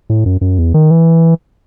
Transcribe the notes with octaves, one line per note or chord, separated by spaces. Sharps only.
A2
F#2
F#2
E2
D#3
E3